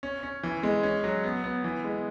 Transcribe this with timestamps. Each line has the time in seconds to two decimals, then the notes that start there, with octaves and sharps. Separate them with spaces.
0.03 C#4
0.23 C#4
0.43 E3
0.63 G#3
0.83 C#4
1.04 F#3
1.24 B3
1.44 B3
1.64 E3
1.84 G#3